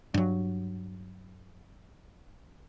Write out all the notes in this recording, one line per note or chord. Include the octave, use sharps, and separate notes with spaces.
G2 F#3